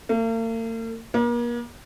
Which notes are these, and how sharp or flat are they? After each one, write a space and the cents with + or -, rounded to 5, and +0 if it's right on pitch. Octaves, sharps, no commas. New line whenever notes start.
A#3 -45
A#3 +40